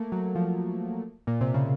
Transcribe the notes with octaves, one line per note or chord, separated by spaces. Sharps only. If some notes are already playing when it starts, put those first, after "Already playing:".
Already playing: A3 A#3
F#3
F3
A#2
C3
C#3